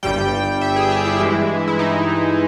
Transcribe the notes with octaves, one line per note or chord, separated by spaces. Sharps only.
G1 G2 G3 G5
E5
G#4
G4
E4
G2 E3 G#3
E4
D#4